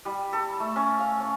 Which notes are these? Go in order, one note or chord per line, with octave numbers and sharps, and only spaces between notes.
G3
A4
A3
C#4
F5
C#4